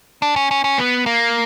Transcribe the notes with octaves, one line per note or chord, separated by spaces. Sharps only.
D4
C#4
C#4
C#4
B3
A#3